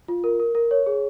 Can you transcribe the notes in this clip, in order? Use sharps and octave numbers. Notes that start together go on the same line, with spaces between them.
F4
A#4
A#4
A#4
C#5
G#4